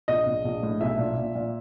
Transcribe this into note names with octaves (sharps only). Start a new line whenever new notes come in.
A#1 D#5
A#1
A#1
A2
B1 E5
A#2
A#2
A#2